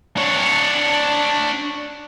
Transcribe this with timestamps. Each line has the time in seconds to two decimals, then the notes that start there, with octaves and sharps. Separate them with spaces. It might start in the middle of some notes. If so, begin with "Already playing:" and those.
0.17 D4 C#5